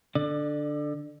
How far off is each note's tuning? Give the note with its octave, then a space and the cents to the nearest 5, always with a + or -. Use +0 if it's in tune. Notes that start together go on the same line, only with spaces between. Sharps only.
D3 +0 D5 +30